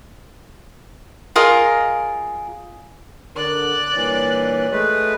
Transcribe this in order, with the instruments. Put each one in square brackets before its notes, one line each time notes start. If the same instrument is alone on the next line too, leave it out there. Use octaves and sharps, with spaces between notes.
[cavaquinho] F4 G#4 A#4 D#5
[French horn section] D3 A#4 [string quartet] D5 F#6
[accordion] A#2 E3 [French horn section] G3 D4 C#5
[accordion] G#3 A3 B4